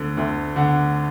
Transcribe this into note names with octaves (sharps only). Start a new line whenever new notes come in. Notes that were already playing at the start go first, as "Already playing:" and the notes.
Already playing: D2 D3
D2
D3 F#5